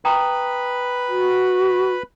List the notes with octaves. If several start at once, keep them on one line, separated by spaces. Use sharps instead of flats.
B4 G5 A#5 B5 D#6
F#4